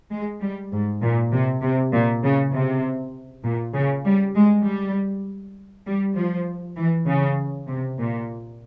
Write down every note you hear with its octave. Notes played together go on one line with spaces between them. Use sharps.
G#3
G3
G#2
A#2
C3
C3
A#2
C#3
C3
A#2
C#3
G3
G#3
G3
G3
F3
E3
C#3
C3
A#2